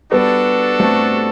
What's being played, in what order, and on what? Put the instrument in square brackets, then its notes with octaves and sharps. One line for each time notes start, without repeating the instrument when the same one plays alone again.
[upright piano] G3 B3 [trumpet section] D4 F#4 A4
[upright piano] A3 C4